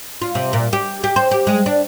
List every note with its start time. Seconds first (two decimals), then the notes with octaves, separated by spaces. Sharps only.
0.22 F4
0.35 C3
0.53 A#2
0.73 G4
1.04 G4
1.16 C5
1.31 G4
1.47 G#3
1.66 D4